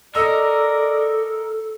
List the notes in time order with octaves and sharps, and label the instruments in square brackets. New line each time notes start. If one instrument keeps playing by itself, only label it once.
[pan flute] A4 [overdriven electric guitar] A#4 [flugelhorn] D5 [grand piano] D#5 E6